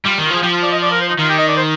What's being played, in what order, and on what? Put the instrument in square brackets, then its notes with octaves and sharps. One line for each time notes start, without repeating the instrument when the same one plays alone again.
[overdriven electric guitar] G3 [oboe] F4
[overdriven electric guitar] D#3
[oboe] F4
[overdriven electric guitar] F3
[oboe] G#4
[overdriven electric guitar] F3 [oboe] G4
[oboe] F4
D5
D#5
D5
A#4
C5
D#4
[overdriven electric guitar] D#3 [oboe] F4
[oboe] G4
D#5
D5
C5